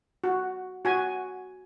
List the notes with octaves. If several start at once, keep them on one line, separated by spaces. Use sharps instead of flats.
F#4
F#4 G#5